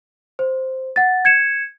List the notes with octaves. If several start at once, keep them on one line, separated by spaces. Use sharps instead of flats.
C5
F#5 A6
G#6 C#7 E7